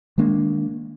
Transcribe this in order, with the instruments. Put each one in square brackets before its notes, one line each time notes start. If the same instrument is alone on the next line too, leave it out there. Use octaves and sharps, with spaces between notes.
[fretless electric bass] D#3 G#3 A#3 D4